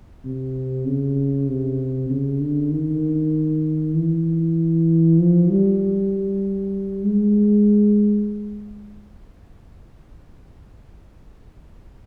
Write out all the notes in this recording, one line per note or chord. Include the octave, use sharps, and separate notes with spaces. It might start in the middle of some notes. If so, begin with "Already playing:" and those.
C3
C#3
C3
C#3
D3
D#3
E3
F3
G3
G#3